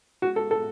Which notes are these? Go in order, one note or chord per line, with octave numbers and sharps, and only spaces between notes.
F#4
A4
A4